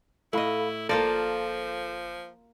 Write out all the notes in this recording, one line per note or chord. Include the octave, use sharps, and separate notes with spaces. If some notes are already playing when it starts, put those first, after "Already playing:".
A2 E4 A4 D#5 F5 B5
G1 F3 A#3 F4 A4 D5 G6 A#6